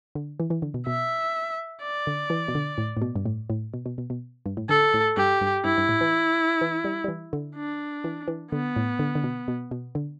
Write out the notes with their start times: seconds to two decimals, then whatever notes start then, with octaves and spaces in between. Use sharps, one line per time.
0.15 D3
0.40 E3
0.50 E3
0.62 D3
0.74 B2
0.87 B2 E5
1.83 D5
2.07 D3
2.30 E3
2.48 B2
2.55 D3
2.78 A2
2.97 A2
3.02 B2
3.16 G2
3.26 A2
3.50 A2
3.74 B2
3.86 B2
3.98 B2
4.10 B2
4.46 G2
4.57 A2
4.69 D3 A4
4.94 A2
5.17 G2 G4
5.41 G2
5.65 G2 E4
5.78 G2
5.89 A2
6.01 E3
6.61 E3
6.84 G3
7.04 G3
7.08 E3
7.33 D3
7.56 D4
8.04 E3
8.28 E3
8.52 D3 B3
8.76 A2
8.99 D3
9.15 D3
9.24 B2
9.48 B2
9.71 B2
9.95 D3